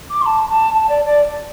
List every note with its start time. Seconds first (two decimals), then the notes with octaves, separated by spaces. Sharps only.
0.10 D6
0.21 C6
0.26 A5
0.49 A5
0.73 A5
0.89 D5
1.05 D5